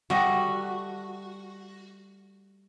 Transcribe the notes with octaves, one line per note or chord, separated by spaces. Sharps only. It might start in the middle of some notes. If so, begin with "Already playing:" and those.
G3 A3 F#4 D#5